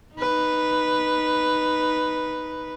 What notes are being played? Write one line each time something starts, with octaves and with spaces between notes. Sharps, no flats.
D#4 B4